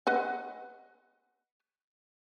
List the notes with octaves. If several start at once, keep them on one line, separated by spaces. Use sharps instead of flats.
B4 D#5 F#5